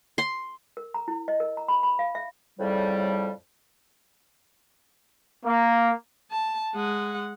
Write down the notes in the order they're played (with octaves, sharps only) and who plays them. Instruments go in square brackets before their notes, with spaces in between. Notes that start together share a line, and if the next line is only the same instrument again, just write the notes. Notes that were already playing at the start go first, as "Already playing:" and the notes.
[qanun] C6
[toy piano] A#4
A#5
E4
D#5
A#4
A#5
B5
B5
F5
E5
[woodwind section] F2 A2 C#3 G3
[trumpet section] A#3
[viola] A5
G#3 F#5